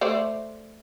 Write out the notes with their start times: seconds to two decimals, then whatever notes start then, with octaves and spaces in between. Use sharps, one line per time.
0.01 A3 C5 D5